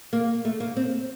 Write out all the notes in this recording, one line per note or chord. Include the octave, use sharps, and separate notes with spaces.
A#3
A3
A#3
C4